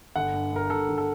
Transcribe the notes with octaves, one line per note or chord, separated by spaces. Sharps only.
G1 F#5
G2
G2 A#4
G1 A4
D3
A4